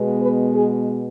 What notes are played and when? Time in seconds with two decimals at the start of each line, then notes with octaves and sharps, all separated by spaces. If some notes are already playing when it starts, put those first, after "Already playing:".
Already playing: B2 G#3 B3
0.20 B4
0.55 G#4